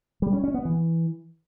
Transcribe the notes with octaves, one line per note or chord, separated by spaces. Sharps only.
G3
C#4
C#4
B3
E3